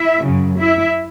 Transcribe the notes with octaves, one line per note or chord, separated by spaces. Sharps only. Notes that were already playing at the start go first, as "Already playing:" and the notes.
Already playing: E4 E5
F#2 C#3 F#3
E4 E5